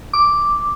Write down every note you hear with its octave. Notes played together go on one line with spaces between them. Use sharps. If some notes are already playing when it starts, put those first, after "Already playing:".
D6